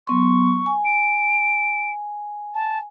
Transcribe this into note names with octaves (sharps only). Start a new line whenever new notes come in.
F#3 B3 C6 C#6
G#5
D7
A5